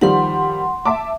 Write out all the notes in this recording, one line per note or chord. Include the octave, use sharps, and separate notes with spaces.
D#3 F3 G3 F#5 C6
E5 A5 D6